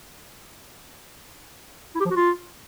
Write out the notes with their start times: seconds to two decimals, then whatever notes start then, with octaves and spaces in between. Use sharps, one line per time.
1.95 E4
2.00 G4
2.05 F3
2.11 F#4
2.16 F4